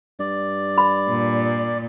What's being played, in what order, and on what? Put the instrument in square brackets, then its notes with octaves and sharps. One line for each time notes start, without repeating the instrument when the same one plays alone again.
[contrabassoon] G2 [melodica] D5
[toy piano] B5
[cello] A#2